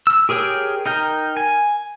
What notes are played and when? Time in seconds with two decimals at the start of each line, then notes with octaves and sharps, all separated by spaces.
0.07 E6
0.29 G4 G#4 A#4 C#5 G5
0.86 D#4 A#4 G5
1.37 G#5